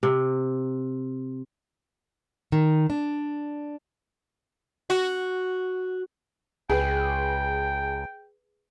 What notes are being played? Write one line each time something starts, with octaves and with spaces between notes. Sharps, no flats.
C3
D#3
D4
F#4
C#2 G#4 B4 G5